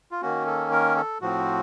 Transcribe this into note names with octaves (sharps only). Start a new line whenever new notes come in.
F4
D#3 A#3 C#4 F#4
A4
A#4
A4
A2 F3 C4 F#4